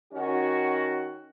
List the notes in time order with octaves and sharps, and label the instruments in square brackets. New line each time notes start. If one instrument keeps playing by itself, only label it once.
[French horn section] D#3 C#4 F#4